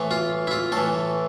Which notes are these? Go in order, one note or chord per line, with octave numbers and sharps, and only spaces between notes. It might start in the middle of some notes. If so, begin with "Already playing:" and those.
Already playing: A2 E3
F4
E4
F4
A2 E3 A4